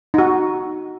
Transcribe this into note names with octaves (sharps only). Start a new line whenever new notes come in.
D#4 F#4